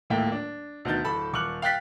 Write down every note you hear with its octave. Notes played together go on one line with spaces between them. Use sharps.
D#1 A2 A3 A#3 E5 G5
D4
D2 B2 D#3 G6 A6
D1 A4 A5 B5
D#1 C#6 D6 F6 F#6 F#7
F5 G5 F#6 A6 B6